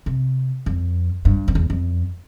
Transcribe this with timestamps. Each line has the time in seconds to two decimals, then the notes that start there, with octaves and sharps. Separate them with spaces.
0.06 C3
0.66 F2
1.25 G2
1.48 F2
1.55 E2
1.70 F2